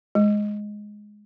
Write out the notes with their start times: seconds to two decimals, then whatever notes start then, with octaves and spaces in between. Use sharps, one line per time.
0.15 G#3